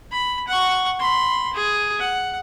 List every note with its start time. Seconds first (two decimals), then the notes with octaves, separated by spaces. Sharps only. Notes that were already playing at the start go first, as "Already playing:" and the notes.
0.11 B5
0.48 F#5 C#6
1.00 B5 C6
1.54 G#4
1.99 F#5